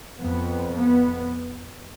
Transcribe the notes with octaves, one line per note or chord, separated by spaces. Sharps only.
F2 B3
B3